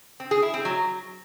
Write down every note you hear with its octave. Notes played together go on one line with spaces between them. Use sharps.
C4
G#4
E4
C4
F#3